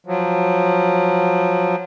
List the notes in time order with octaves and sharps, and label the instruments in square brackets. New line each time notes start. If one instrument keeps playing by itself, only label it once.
[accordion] F3 F#3